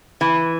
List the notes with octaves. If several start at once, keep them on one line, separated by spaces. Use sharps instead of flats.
E3